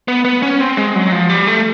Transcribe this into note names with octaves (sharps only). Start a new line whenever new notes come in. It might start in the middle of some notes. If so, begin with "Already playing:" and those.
B3
B3
C#4
C4
G#3
F#3
F3
G3
A3